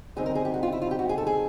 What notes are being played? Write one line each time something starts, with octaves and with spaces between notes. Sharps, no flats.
F#2 D3 G3 C4 D#4 G#4
A#4
G#4
G4
F#4
F4
E4
F4
G4
F#4
G#4
A4
G#4